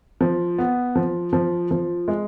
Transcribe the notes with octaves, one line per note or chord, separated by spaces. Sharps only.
F3
B3
F3
F3
F3
G#3